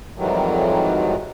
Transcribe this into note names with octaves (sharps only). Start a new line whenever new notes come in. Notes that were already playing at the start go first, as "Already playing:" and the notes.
F2 G#2 D#3 E3 F#3 G3